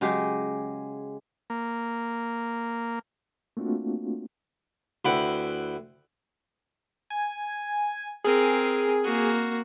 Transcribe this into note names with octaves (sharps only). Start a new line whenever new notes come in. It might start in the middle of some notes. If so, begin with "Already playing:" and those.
C#3 F#3 G#3 G4
A#3
A3 A#3 C4 D4 F4 F#4
D2 E4 B4 F#5 G5
G#5
C4 G#4 A#4
A#3 F#4